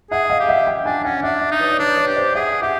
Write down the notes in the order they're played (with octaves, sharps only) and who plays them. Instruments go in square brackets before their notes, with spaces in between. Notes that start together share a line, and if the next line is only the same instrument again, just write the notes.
[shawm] G#4 [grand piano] E5 F#5
[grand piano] D#5 F5
[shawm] G4
[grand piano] E5 F#5
F5 G5
[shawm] D4 [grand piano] F#5 G#5
[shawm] C#4 [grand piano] F#5 G#5
[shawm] D4 [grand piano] E5 F#5
[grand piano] E5 F#5
[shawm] D#4
[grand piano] B4 C#5
D5
[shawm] D4 [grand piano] B4 C#5
[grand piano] B4 C#5
[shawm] G4
[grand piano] C5 D5
[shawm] G#4 [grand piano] E5 F#5
[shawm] G4 [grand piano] E5 F#5